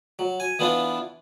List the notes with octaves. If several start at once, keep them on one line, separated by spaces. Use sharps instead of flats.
F#3
G#5
E3 B3 D4 E4 F4